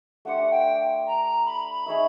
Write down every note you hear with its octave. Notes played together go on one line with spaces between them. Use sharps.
A3 D4 G4 C5 F#5
G5
A#5
B5
D#4 G#4 C#5 E5